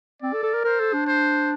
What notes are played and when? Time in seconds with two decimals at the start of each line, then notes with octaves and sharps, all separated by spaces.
0.22 C4 D5
0.33 A4
0.43 A4
0.54 A#4
0.64 A#4 C5
0.80 A4
0.94 D4
1.07 C5